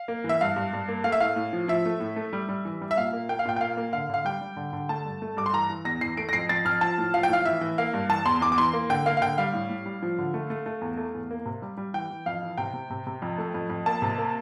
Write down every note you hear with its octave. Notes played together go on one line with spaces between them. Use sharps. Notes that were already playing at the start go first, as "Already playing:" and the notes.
Already playing: F5
A#3
E3
E5
G2 F5
G2
G2
A#3
A3 F5
E5
A2 F5
A2
F3
F3 E5
A3
A2
A3
G3
G3
E3
G3
E5
A#2 F5
A#3
A#3 G5
F5
A#2 G5
G5
A#3 F5
A#3
D3 F5
D3 F5
G3 G5
G3
D3
D3
A3 A5
G2
A3
G2 D6
C6
E3 A#5
E3
E2 A#6
E3 C7
A3 D7
A#6
F2 C7
F2 A6
F2 F6
F3 A5
A2
F3 F5
G5
A2 F5
E3 E5
E3
A#3 F5
G2
E3 A5
E2 C6
E2 D6
D6
E3 C6
A#3
D3 G5
A#3 F5
F5
D3 G5
G3 F5
A2
A2
G3
F3
D3
A3
A3
A3
E2
A3
E2
A#3
C3
G3
G3
E3 G5
E3
F2 F5
E3
C3 G5
C3
C3
C3
F2
A3
F2
F2
A#3 A5
C3
A#3